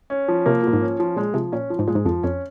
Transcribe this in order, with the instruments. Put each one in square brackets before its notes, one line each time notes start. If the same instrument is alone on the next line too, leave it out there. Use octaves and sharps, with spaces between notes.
[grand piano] C#4
F3
[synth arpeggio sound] C3 [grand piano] A#3
[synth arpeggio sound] A#2 [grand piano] F3
[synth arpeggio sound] G#2
[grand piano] C#4
F3
[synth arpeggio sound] A#2 [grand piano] G#3
[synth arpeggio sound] C3 [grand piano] F3
[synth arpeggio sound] A#2 [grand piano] C#4
[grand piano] F3
[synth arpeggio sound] G#2
[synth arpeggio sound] A#2 [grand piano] G#3
[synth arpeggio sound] G#2
[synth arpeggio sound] F2 [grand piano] F3
[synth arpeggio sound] F2 [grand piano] C#4